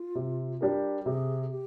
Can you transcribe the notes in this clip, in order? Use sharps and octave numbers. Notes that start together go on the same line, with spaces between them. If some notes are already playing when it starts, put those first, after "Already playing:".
Already playing: F4
C3
G3 D4 G4 A#4
C3 G#4
G4